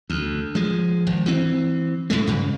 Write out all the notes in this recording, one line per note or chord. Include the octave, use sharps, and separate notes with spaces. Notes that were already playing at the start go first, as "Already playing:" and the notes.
D2
F3 G#3
G#1
E3 C4
A2 G#3 A3
G2 C#3